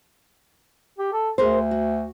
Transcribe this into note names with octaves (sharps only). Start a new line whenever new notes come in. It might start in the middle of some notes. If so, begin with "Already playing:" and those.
G4
A4
D2 G#4 A#4 C5
F#4